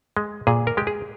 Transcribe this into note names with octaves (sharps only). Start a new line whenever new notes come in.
G#3
A#2 G#4
A#4
G#3 G4
G#4